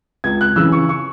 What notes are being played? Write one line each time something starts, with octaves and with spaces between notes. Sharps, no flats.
C#2 G#6
F#6
C#3 E3 E6
C#6
C#6